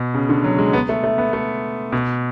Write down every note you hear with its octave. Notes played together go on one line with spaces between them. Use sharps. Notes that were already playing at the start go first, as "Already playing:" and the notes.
Already playing: B2
C#3
D3
F#3
G#3
B3
A3
A3
B3
A3
B2